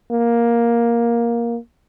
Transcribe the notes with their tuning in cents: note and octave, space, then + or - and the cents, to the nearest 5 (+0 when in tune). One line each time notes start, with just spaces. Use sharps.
A#3 +10